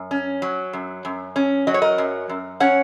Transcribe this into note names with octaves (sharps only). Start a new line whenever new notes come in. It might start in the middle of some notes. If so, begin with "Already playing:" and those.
Already playing: F#2
C#4
F#3
F#2
F#2
C#4
F#3 D#5
C#5
A#4 D#5
F#2
F#2
C#4 C#5 F#5